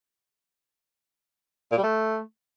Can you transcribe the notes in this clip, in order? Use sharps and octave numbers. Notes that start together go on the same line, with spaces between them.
A#2
G3
A3